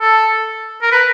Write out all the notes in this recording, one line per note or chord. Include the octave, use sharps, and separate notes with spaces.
A4
A#4
B4